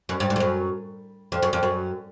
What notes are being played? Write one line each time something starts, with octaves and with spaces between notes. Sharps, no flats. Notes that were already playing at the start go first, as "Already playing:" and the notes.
F#2
G2
G#2
F2
F#2
F2
F#2
F2
F#2